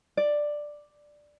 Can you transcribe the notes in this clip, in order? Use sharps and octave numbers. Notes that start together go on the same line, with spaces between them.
D5